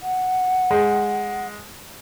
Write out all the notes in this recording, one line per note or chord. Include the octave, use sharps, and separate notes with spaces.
F#5
G#3